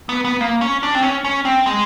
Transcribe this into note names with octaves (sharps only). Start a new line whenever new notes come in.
B3
B3
A#3
C#4
D4
C4
C#4
C#4
C4
G#3